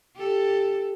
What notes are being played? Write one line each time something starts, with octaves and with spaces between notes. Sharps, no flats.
G4 A4